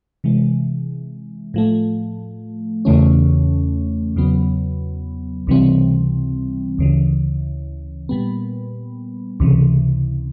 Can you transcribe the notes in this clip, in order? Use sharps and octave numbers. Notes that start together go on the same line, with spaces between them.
C3 E3 G#3
A2 F3 A3
E2 C#3 E3 A3 C#4
E2 C#3 F#3 B3
C#2 C3 E3 G3 C4
D2 C#3 E3
A#2 G3 B3
C#2 C3 E3